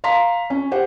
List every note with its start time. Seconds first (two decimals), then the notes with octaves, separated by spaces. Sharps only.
0.04 F5 A#5 C6 B6
0.50 C#4
0.71 G4 C5 F#5